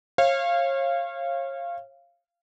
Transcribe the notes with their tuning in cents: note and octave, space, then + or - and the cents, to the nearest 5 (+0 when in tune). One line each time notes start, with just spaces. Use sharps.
C#5 -35 F5 -15